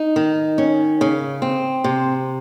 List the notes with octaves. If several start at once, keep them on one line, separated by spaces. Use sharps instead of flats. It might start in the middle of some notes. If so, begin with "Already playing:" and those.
Already playing: D#4
D#3
C#4
C#3
C4
C3